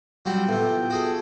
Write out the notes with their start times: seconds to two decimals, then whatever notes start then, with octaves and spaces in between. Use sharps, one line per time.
0.25 F#3 G3 C4 F4 F#4 F#5 G5
0.48 A2 C3 B3 F4
0.90 F#4 G#4 A4